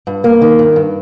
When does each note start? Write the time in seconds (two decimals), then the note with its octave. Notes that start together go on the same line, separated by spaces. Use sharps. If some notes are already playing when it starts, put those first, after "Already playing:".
0.07 G2
0.24 A#3
0.41 D#3
0.59 G2
0.76 G2